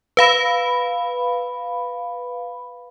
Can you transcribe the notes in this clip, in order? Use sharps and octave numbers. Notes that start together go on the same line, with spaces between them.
B4 F5 B5